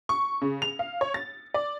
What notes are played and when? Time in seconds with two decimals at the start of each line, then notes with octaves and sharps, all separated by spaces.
0.09 C#6
0.42 C#3
0.62 F7
0.79 F5
1.01 C#5
1.14 A6
1.54 D5